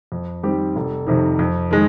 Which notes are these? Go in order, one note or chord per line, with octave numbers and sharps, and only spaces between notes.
F2
D#3 G3 C4 G4
F1
F2 C3 D#3
F2
D#3 G#3